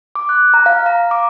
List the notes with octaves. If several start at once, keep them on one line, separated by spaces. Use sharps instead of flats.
D6
F#6
A#5
F5
A#5
D6